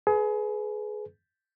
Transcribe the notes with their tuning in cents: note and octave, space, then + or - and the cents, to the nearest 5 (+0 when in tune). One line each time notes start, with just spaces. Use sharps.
G#4 +30 B4 +5